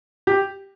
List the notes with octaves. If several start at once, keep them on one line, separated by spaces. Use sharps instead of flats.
G4